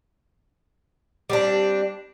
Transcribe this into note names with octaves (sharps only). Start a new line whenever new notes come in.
G3 C4 D4